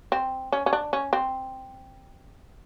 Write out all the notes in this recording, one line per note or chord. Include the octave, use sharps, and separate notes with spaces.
C4
C#4
C#4
D4
C#4
C4